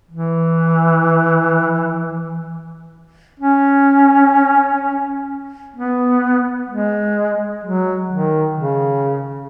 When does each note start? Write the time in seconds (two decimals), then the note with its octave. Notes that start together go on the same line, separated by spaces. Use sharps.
0.11 E3
3.40 C#4
5.76 B3
6.70 G#3
7.64 F#3
8.11 D#3
8.57 C#3